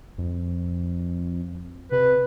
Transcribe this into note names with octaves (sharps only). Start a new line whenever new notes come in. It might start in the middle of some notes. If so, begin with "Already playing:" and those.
F2
C3 B4